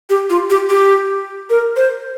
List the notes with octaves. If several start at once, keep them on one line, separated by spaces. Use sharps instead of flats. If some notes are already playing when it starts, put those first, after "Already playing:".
G4
F4
G4
G4
A#4
C5